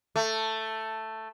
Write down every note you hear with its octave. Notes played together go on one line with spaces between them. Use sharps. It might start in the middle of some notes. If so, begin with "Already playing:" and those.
A3